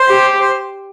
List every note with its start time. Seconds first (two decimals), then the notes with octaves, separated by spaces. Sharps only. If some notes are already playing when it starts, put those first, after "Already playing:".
Already playing: C5
0.08 G4
0.40 C5